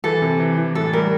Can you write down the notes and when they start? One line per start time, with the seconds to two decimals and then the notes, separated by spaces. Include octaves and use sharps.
0.04 E3 A4
0.22 C3
0.40 E3
0.58 E3
0.75 A2 A4
0.93 G3 A#4